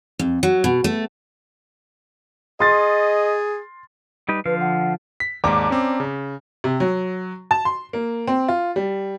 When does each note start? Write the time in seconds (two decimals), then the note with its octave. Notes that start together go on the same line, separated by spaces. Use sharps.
0.19 F2
0.43 F#3
0.64 B2
0.84 A3
2.60 G#4 D#5 C6 A6
4.29 G3 D#4 B4
4.46 D3 F3 B4 F5
4.60 F#5
5.20 B6
5.44 D#2 G#2 D5 A5 A#5 D6
5.70 C4 C#4
6.00 C#3
6.64 C3
6.80 F#3
7.51 A5
7.65 C6
7.93 A#3
8.27 C4
8.48 F4
8.76 G3